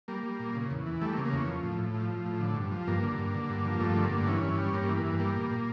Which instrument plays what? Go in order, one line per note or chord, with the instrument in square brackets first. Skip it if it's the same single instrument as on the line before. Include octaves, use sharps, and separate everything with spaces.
[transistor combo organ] G3 A#3
G3
A#2
C#3
E2
E3
G3 A3
A#3
C#3
A#3
E2 C#4
F3
A2
A2
F3
F3
A2
D3
G2
F3
G2 A#3
D3
G2
D3
G2
F3
G2 A3
D3
A#3
G2
E3 C#4
G2
G3
G2 A#3
E3
A#3
G2
G3 A#3
A#2
A#2